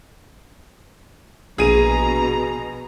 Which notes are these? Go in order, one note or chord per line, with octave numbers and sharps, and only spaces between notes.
A#1 B2 G#4 A#5 D#7